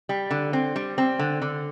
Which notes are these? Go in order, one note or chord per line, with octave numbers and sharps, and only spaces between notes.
G3
D3
C4
G3
C4
D3
D3